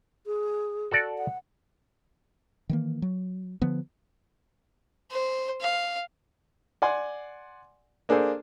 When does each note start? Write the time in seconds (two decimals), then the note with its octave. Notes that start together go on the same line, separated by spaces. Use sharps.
0.26 G#4
0.91 F#4 A4 D5
1.18 F#5
2.69 D#3 E3 A#3
3.02 F#3
3.62 D3 F3 B3
5.11 C5
5.61 F5
6.82 D5 F#5 G#5 C6
8.09 A#3 D4 G#4 A4 C5